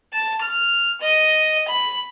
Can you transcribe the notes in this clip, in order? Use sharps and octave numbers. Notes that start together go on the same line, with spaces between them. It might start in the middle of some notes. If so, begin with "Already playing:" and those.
A5
F6
D#5
B5